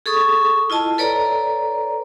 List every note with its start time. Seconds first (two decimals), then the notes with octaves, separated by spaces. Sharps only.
0.06 G#4 A4 C#6 D#6
0.70 E4 F4 D#5 A5
0.98 A4 B4 C#5 D5 A#5